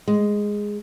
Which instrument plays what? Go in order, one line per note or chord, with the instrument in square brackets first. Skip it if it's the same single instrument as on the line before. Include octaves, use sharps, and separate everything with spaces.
[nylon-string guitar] G#3